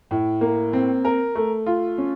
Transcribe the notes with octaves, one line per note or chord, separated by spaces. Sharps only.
A2
A#3
C4
A#4
A3
F4
C#4